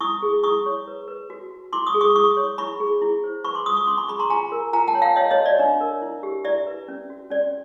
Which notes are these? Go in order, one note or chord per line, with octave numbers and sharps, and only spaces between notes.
E4 C#6 D#6
G#4
E4 C#6 D#6
C#5
B4
B4
F#4
F#4
E4 C6 D6
C#6 D#6
G#4
C#6 D#6
E4 C#6 D#6
C#5
E4 B5 C#6
G#4
E4
C5
B4 B5 C#6
C6 D6
F4 C#6 D#6
C#6 D#6
C#4 C6 D6
B5 C#6
G#4 B5 C#6
A#5 C6
F4 G#5 A#5
A#4
F4 G#5 A#5
G5 A5
C#5
F5 G5
C#5 D#5 F5
C#5 D#5
F#4
D5
D4
A#4
E4
G4
E4 D5 E5
B4
C#4
F#4
C#4 D5